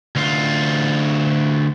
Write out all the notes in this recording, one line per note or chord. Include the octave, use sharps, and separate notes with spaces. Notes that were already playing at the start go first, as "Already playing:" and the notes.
D2 F4